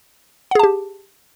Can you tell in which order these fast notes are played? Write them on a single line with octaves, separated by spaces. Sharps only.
F#5 G#4 A5 G4